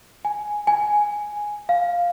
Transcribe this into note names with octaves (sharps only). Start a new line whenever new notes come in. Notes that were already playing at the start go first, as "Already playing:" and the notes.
G#5
G#5
F5